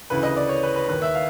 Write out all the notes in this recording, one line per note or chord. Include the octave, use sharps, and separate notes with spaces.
D2 C#3 E3 B4
D#5
D5
C#5
B4
B4
D#2 D#3 B4
E5
F5